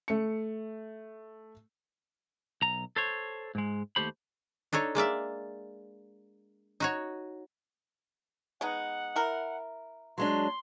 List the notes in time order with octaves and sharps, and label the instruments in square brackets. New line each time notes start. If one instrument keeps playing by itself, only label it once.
[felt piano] A3 C#7
[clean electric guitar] B1 A#5
A4 C5 C#5
G#2 G#3
D#2 D#3 A3 G4 C5 B5
[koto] D4 D#4 A4 C#5
G#3 A#3 D5 E5
D#4 F#4 C#5
[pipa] G#3 B3 D#4 [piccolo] F#5
[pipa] E4 A#4
[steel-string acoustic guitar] F#3 G#3 D4 [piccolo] C6